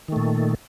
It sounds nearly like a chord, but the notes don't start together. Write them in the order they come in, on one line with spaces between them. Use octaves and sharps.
D#3 A3 A#2